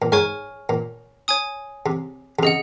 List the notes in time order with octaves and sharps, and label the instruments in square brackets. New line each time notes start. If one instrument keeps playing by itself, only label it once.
[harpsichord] A#2
[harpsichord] G#2 [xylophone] C#5 G#5 C#6 F6
[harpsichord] A#2
[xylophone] C#5 G#5 D#6
[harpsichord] C3
C3
[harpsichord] C#3 [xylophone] G#4 D#5 F#5